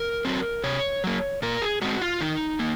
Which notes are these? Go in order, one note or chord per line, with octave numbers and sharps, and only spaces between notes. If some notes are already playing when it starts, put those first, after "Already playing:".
Already playing: A#4
F#3 C4
C3 C#5
F#3 A#3
A#2 A#4
G#4
G#3 C4 F#4
F4
D#3 D#4
A#3